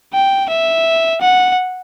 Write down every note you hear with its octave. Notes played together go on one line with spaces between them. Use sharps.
G5
E5
F#5